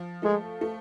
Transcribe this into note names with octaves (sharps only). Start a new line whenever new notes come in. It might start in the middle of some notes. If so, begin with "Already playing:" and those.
Already playing: F3
G#3 A3
A3